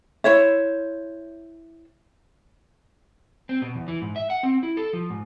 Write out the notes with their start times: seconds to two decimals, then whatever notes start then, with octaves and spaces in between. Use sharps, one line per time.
0.24 E4 C5 C#5 E5
3.49 C4
3.62 B2
3.75 E2
3.88 E3
4.02 G#2
4.16 E5
4.30 F#5
4.43 C4
4.63 E4
4.77 A4
4.93 F3
5.10 G#2